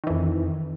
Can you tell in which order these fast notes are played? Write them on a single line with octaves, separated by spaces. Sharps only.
D#3 E3 F2